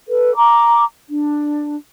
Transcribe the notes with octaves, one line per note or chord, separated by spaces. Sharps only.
A4 B4
A#5 D6
D4